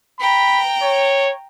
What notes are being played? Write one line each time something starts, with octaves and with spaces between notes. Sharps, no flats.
G5 A#5 B5
C#5